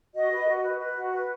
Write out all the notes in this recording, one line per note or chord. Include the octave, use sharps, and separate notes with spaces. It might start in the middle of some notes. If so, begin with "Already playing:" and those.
F#4 D#5
B4
F#4
B4
B4
F#4
B4